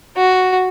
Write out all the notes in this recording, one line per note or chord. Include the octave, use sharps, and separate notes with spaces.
F#4